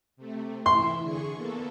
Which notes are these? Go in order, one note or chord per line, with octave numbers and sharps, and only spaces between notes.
C3 A3
E3 E4 E5 C6
D3 G#4 C#6
A#3 B3 A4